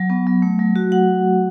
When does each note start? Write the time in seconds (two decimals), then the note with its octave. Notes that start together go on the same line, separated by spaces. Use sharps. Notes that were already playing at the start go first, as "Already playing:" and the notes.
Already playing: F#3
0.10 B3
0.27 F#3
0.42 A3
0.59 F#3
0.76 F#4
0.92 F#5